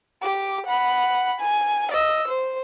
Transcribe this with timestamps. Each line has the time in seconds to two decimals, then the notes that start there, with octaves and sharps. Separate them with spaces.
0.22 G4 D6
0.67 F#5 B5
1.41 G#5
1.92 D#5 E6
2.28 C5